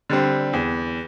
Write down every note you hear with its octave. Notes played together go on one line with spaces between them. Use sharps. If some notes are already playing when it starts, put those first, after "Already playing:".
D3 G3 C4
E2